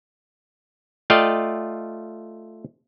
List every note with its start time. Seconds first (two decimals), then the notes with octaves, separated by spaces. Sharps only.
1.10 A3 F4 D5 D#5 F5 G5